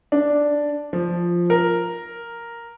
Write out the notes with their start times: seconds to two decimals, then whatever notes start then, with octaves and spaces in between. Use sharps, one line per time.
0.12 D4
0.93 F3
1.50 A#4